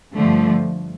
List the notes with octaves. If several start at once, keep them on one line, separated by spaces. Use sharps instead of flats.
G2 D3 F3 A3